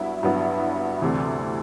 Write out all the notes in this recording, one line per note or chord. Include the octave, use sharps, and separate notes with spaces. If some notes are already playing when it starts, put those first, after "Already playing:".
Already playing: G2 F#3 B3 E4
G2 F#3 B3 E4
D2 C3 E3